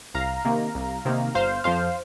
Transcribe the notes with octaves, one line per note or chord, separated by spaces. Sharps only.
C2 F5 A#5
C3 D#3 A#3
C2
C3 D#3 A#3
G1 C5 F5
F2 F3 C5 F5